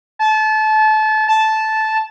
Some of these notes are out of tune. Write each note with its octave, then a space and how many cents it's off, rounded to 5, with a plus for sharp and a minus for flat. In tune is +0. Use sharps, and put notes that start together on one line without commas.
A5 -25
A5 -10